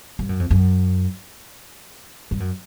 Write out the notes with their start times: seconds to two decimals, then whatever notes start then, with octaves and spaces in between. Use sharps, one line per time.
0.19 G2
0.29 F#2
0.39 F2
0.51 F#2
2.31 G2
2.40 F#2